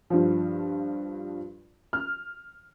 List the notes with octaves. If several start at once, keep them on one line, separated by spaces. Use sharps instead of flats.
G2 F3
F6